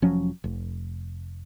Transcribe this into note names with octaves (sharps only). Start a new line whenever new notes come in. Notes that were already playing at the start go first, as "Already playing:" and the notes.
F1 F3 F#3 C#4
F1